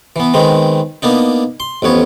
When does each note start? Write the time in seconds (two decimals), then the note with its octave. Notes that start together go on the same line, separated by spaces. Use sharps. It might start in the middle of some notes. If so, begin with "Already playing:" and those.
0.16 E3 B3
0.34 D#3 G#3 B3 C4
1.02 A#3 B3 D4 D#4
1.60 C6
1.82 A1 F2 B3 C#5